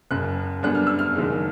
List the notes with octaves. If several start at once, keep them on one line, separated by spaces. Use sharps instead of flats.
F#1 F#2 C#3 F#6
F#2 D3 G3 B3 D4 F#6
F6
E6
F6
F#1 F#2 D#3 G#3